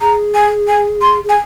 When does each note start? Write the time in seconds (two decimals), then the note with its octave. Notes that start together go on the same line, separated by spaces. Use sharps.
0.01 G#4 A#5
0.35 G#5
0.68 G#5
1.02 C6
1.24 G#4
1.29 G#5